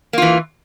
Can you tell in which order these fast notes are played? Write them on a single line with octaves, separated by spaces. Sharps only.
A#3 F4 E3